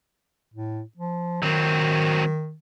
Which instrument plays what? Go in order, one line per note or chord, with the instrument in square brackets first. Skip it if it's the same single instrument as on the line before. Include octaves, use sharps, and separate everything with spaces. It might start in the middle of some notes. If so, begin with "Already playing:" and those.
[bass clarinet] A2
F3
[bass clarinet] D#3 [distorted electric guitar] F#3 C4